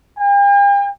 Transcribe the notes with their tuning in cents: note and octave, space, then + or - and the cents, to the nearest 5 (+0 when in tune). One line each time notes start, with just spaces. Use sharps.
G5 +45